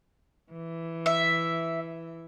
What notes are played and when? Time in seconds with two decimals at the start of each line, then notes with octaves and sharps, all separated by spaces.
0.53 E3
1.06 E5